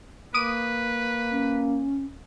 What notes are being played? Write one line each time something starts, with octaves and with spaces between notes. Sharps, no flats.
A#3 B4 D6 D#6 D#7
C#4